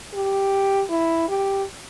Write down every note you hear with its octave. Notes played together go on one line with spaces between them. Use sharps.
G4
E4
G4